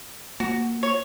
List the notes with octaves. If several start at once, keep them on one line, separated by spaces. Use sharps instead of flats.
A#3 F#4
C#5